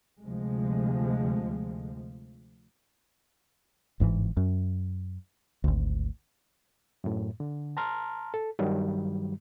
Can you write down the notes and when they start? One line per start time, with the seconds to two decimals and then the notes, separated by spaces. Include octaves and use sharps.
0.24 D2 C3 F3 G#3
4.00 G1 G#2 D3 E3
4.37 F#2
5.64 G#1 D2
7.04 F#2 A2
7.40 D3
7.77 A5 A#5 C6 F6
8.34 A4
8.59 G2 D#3 F#3 G3